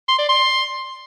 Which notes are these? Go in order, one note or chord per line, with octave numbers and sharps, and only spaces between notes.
C6
D5
C6